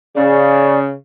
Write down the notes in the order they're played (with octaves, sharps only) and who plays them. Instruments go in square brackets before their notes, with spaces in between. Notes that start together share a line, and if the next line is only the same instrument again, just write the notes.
[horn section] C#3 [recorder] D5